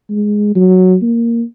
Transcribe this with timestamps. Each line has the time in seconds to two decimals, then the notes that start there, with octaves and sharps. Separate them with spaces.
0.09 G#3
0.55 F#3
1.02 A#3